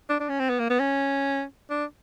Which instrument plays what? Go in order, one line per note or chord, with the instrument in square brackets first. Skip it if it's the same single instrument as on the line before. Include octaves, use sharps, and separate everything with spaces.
[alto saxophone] D4
D4
C#4
C4
B3
A#3
B3
C#4
D4